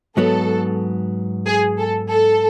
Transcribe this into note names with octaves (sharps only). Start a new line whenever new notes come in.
G#2 F#3 B3 A4
G#4
A4
A4